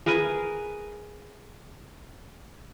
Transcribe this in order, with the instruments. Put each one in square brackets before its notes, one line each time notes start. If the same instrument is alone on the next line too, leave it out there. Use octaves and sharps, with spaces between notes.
[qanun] G#4 A#4 B4 G#5